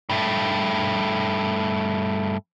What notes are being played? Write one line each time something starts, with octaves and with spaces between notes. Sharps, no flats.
G2 A3